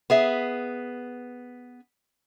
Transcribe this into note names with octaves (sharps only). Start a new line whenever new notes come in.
B3 G#4 E5